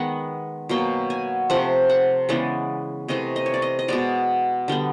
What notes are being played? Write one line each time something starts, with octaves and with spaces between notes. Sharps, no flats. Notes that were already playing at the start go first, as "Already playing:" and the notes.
Already playing: D#3 G#3 B3 F#5
B2 F#3 A#3 G5
G#5
C3 F3 A3 F#5
F#5
C#3 E3 G#3 B3 D5
C3 E3 A3 D#5
D#5
C#5
D5
D#5
D#5
B2 G#3 B3 D5
D3 G3 B3